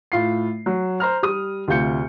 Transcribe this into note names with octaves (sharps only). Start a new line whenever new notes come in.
A2 F4 C7
F#3
C5 A#5 F6
G3 D#6
D2 C3 F4 G6 C#7